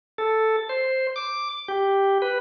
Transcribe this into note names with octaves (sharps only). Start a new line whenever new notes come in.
A4
C5
D6
G4
B4